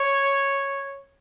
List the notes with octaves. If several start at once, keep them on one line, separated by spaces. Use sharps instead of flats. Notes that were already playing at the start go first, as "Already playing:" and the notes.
Already playing: C#5